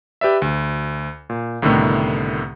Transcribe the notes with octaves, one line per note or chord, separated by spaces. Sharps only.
G4 B4 D5 E5
D2
A#2
C2 A2 D3 D#3 A3 B3